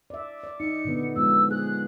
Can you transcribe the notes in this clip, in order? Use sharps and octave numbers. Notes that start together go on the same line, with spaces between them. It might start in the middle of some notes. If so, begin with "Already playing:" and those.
D5 E5
D5
D#4 C#7
A#2 D3 B3
F3 G#3 B3 E6
G#4 F#6